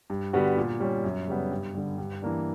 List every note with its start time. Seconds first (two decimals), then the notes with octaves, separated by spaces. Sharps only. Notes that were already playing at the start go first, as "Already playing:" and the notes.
0.10 G2
0.33 D3 G3 B3 F#4
0.57 A#2
0.80 G3 C#4
1.04 F#2
1.28 C#3 G3 B3
1.51 G2
1.75 D3 G3
1.98 G2
2.22 E3 A#3 D4